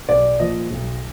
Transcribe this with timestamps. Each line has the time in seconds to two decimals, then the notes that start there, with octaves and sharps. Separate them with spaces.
0.08 B1 D5
0.39 A#2 F3 D#5
0.70 B1